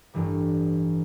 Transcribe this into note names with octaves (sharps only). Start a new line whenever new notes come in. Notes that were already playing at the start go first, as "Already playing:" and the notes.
A1 G2 E3 G3